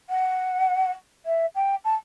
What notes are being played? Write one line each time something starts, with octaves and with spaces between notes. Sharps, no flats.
F#5
E5
G5
A5